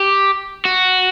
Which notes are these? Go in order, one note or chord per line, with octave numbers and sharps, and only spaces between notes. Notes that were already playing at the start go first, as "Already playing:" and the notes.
Already playing: G4
F#4